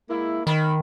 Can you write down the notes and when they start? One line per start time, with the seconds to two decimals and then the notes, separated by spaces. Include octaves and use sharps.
0.10 G#3 A#3 E4
0.47 D#3 D#4 D#5 B5